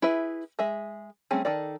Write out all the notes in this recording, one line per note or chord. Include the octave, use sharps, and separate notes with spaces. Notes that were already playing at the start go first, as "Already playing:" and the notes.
E4 G#4 B4 E5
G#3 G#4 E5
G3 A3 C4 C#4 G#4
D#3 A4 D5